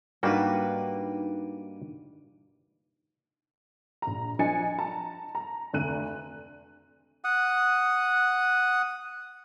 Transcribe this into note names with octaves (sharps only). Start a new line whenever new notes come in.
G#2 G3 A#3 D4 D#4 F#4 B4 G5
A#1 A#5
F3 D4 D#5 G#5 A6 C#7
A5 A#5
A#5
F1 D2 F#6 D#7
F#5 D#6